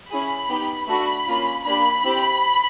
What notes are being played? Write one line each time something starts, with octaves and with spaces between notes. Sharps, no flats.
C#4 E4 G#4 B5
B3 D#4 G4
A3 D4 F#4 A4 B5
A#3 C#4 F4
A#3 D4 G4 B5
C4 E4 G4